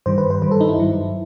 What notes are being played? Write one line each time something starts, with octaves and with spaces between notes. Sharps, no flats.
G2 D#3 G3 C5
B4
C5
G2 D#3 G3 B4
A4
D#4
E4
G2 F#3